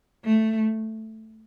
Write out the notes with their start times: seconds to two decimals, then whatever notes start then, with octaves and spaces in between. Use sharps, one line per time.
0.25 A3